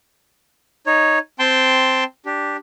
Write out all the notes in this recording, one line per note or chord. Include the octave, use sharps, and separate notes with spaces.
D#4 C#5
C4 G5 A5 C6
D4 G4